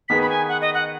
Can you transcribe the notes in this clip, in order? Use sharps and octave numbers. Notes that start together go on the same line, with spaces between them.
D#3 B3 G#4 B4 B6
B5
G#5
F#5
D#5
F#5